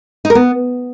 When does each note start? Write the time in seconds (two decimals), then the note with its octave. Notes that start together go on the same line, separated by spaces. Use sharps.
0.25 D#4
0.30 A#4
0.35 B3